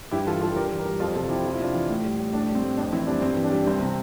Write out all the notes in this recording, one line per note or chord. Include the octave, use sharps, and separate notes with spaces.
G2 E4 G4
E3 F4 A4
G3 F4 A4
G2 G4 A#4
E3
G4 A#4
G3
F2 F4 A4
C3 F4 A4
F3 E4 G4
F2 F4
E4
C3 D4 F4
E3
A2
G3
A2
A2 D4
G3
C4
A2
F2 D4
E3 C4 E4
G3 D4
G2 C4
E3
D4
G3
C2 C4
C3